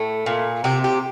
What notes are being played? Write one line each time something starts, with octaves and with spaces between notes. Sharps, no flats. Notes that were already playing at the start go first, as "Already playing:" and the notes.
Already playing: A2 A3
A#2
C3 G4
G4